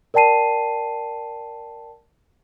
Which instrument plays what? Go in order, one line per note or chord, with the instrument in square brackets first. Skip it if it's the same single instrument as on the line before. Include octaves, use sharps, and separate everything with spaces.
[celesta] A#4 D5 G5 A5 C7 D#7